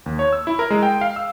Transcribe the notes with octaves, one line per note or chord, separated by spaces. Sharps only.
D#2
C#5
E6
E4
A#4
G#3
G5
F5
E6